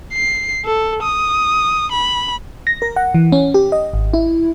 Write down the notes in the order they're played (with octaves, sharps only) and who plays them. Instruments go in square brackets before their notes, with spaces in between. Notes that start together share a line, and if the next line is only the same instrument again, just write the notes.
[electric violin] C7
A4
D#6
B5
[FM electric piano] A#6
A#4
F#5
E3
C#4
G4
D#5
G#1
E4